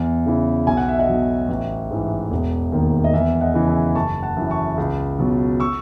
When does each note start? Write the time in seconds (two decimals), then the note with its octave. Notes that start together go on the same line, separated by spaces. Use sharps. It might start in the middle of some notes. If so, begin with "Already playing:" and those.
Already playing: E2
0.26 C#3 E3
0.67 B1 G#5
0.77 F#5
0.88 E5
0.99 D#5 F#5
1.08 B2 F#3
1.48 A1
1.90 G#2 E3
2.31 E1
2.72 D#2 D#3
3.04 D#5
3.13 E2 E5
3.41 D#5 F#5
3.54 C#3 E3
3.68 E5 G#5
3.95 F#1 A5 C#6
4.22 F#5 A5
4.37 F#2 E3
4.50 A5 C#6
4.77 C#2
5.19 B2 F#3
5.60 C#6 E6